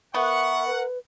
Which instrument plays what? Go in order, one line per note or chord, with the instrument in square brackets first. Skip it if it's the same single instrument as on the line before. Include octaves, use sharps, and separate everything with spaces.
[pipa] B3 [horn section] A#4 F#5 [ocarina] E5 [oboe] C#6
[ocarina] B4